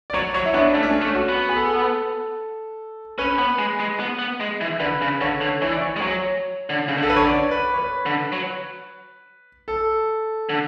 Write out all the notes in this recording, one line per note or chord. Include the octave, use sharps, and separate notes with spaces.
D5
F#3 C#5
F#3 C#5
E4
B3 D4
A3 C#4
D4
C#4
A3
F#4
B3
G#4
A4
C#4 B4
B3
G#3
G#3
B3
B3
G#3
E3
D3 B4
C#3
D3 C#5
D3
E3 C#5
D5
C#5
G#3
F#3 C#5
D3
C#3
D3
A4
B4
C#5
D5
B4
C#5
B4
D3
F#3
A4
D3